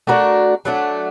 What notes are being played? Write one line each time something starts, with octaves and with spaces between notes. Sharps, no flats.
A3 D4 F#4 A#4
F#3 A3 D4